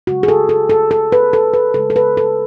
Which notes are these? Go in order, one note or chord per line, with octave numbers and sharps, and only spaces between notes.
C#3 G#3 F#4
G#4
A4
A4
A4
A4
B4
A4
B4
C#3 G#3 A4
A4
B4
A4